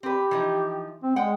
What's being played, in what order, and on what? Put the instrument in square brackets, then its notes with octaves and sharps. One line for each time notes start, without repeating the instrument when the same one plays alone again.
[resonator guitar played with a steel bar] C4 B4 [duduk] G4
[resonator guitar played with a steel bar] E3 F3 D#4
[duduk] C4
[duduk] G#3 [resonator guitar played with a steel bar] F#5 G5